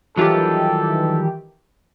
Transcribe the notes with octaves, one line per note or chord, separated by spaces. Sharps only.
D#3 E3 F#3 G3 F4 G4 A4